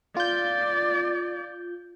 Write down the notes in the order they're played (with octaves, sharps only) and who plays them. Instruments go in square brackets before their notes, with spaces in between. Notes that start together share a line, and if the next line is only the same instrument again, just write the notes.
[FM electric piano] F4 G6 [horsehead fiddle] D5